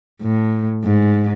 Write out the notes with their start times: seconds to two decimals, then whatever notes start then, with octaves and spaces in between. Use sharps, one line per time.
0.22 A2
0.84 G#2